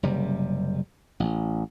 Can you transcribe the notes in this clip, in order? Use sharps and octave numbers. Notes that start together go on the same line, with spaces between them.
F#1 C3 G3
A1